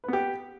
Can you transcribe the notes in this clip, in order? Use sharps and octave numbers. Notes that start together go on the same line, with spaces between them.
B3 G4 B4